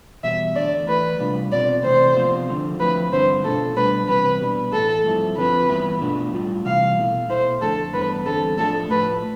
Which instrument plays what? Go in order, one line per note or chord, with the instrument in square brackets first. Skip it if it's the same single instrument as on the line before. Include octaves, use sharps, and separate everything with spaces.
[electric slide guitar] E2 B2 G3 [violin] E5
[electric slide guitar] E2 D3 A3 D4 [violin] D5
[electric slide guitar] E3 A3 E4 [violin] B4
[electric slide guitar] C3 G3 D4 F4
[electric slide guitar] B2 A3 C4 F4 [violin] D5
[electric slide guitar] C3 E3 A3 [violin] C5
[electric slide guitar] C3 F3 B3 F4
D3 F3 A3
[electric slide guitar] D3 F3 C4 E4 [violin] B4
[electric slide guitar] G2 D3 A3 C4 E4 [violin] C5
[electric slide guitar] B2 A3 D4 F4 [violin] A4
[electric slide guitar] B2 G3 D4 [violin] B4
[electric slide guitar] C3 E3 G3 C4 [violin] B4
[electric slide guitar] B2 G3 D4
[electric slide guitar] A2 E3 A3 [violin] A4
[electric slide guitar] G2 F3 C4 E4
[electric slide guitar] D3 F3 C4 F4 [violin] B4
[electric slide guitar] G2 E3 B3 E4
B2 A3 D4 F4
A2 G3 D4 F4
[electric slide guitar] C3 E3 G3 [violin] F5
[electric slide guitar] B2 A3 E4
[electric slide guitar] B2 A3 E4 [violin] C5
[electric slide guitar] F2 D3 A3 [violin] A4
[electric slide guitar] G2 E3 B3 D4 [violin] B4
[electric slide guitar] E2 D3 G3 C4 [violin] A4
[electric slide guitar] A2 F3 A3 D4 [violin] A4
[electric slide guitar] A2 F3 A3 [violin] B4